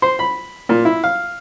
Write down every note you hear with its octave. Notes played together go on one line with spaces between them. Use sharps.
C5
B5
A#2
E4
F5